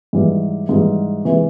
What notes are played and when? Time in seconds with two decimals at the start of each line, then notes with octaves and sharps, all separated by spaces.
0.13 G#2 E3 G3
0.69 G#2 E3 G3
1.24 C3 E3 G#3